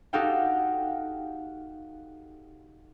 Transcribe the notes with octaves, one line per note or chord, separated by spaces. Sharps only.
D#4 F#4 G4 A4 F5 G5